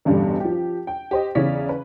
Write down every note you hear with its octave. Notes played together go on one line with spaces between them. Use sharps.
A1 E2 G2 B2 D3 G3
F3 G4
G5
G4 C5 D#5
E2 C#3 E3 C#5 D5 B6
B4